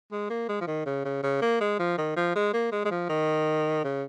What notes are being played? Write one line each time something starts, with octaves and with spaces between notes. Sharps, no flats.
G#3
A#3
G#3
F3
D#3
C#3
C#3
C#3
A#3
G#3
F3
D#3
F3
G#3
A#3
G#3
G#3
F3
D#3
C#3